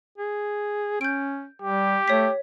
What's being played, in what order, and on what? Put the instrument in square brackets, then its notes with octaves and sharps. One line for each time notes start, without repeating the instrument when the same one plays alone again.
[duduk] G#4
[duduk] C#4 [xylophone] G6 D7
[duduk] G3 [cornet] G4
[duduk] A3 [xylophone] C#5 B6